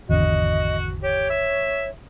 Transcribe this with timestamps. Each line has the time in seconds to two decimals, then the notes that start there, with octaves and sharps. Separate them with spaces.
0.09 G#1 E2 D3 F#4 D#5
1.03 G4 C#5
1.30 E5